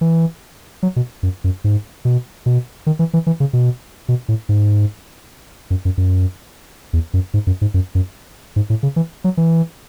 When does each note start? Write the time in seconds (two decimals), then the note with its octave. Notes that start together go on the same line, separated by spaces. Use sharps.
0.01 E3
0.83 F#3
0.96 B2
1.23 F#2
1.44 F#2
1.64 G#2
2.05 B2
2.46 B2
2.86 D#3
2.99 E3
3.14 E3
3.27 E3
3.40 C#3
3.53 B2
4.09 B2
4.28 A2
4.49 G#2
5.70 F#2
5.85 F#2
5.98 F#2
6.93 E2
7.14 F#2
7.34 G#2
7.47 F#2
7.61 G#2
7.74 F#2
7.95 F#2
8.56 G#2
8.70 A2
8.83 C#3
8.96 E3
9.24 F#3
9.37 E3